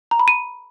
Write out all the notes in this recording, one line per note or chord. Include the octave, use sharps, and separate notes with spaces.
A#5
B5
D#7